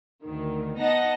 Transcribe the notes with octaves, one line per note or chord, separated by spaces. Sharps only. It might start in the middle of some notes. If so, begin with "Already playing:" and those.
D2 D#3
B3 D#4 D#5 F#5 A5 A#6